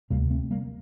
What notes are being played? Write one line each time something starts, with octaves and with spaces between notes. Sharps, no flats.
D2 C3 G3 A#3
A3 C4
G3 A#3